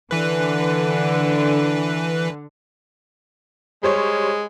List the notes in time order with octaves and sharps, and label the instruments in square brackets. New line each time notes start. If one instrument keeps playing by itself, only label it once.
[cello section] D3 [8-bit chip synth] E3 B4
[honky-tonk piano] G3 C5 C#5 [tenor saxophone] G#3